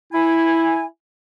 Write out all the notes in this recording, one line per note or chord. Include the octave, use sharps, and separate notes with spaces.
E4 G#5